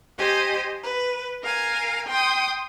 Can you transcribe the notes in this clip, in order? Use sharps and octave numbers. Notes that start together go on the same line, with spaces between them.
G4 C5 D#5 G#5
B4
A#4 F5 G#5
G5 C6 D#6